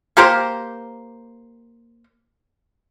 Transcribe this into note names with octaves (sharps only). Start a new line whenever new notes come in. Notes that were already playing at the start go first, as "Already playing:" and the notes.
A#3 G4 A#4 C5